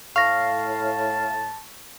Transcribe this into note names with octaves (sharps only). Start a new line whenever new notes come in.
A2 F5 A5 C#6 A#6